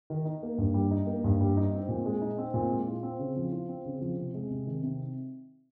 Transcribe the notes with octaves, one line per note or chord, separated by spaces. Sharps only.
D#3
D#4
A#3
G2
G3
D#4
A#3
G2
G3
D#4
C4
A#2
G#3
D#4
C4
A#2
G#3
F4
C4
C#3
F3
F4
C4
C#3
F3
C3
G#3
C3
D#3
C3